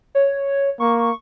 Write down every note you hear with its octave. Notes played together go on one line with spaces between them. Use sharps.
C#5
A#3 C#6